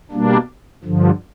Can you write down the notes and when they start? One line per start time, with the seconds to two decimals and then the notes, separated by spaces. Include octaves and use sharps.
0.11 B2 G3 A#3 D4
0.84 G2 D3 F3